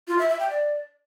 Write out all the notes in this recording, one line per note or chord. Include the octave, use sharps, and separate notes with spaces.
F4
E5
E5
G5
D5